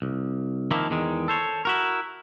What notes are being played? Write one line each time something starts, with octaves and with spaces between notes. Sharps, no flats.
C2
D#3 F3 A#3 E4
E2 D#3 G#3
A4 C5 C#5
E4 F#4 A#4